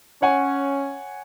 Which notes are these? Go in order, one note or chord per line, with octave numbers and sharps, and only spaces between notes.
C#4 C#5 F#5 G#5